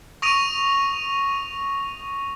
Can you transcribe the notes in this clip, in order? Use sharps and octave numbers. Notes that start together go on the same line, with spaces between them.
C#6 D#6 A#6 D7 D#7 F7